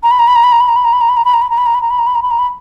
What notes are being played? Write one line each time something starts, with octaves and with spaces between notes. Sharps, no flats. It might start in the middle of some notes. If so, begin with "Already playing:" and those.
A#5
B5
A#5
B5
A#5
B5
A#5
B5
A#5
B5
A#5
B5
A#5
B5
A#5
B5
A#5
B5
A#5
B5
A#5
B5
A#5
B5
A#5
B5
A#5
B5
A#5
B5